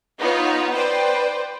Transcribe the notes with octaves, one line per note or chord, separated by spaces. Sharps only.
B3 D#4 F4 C#5
B4 C5 D5 G5